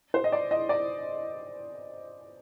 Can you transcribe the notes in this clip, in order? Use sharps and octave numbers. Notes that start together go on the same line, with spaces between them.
C5
D#5
D5
D#5
D5